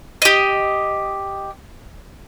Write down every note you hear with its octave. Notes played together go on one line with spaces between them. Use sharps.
G4 D#5